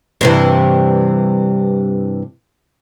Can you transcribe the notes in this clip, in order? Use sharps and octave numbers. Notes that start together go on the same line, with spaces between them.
G2 C3 E3